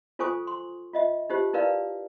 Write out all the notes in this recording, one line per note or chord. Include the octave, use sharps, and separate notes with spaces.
F4 A4 C5 G#5 C#6 D#6
C6
F4 D#5 E5
D#4 F4 G4 C5
D#4 E4 A#4 B4 D5 F5